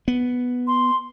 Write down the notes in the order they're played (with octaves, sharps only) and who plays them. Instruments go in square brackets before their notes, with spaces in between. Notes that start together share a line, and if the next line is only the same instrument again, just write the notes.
[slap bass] B3
[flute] C6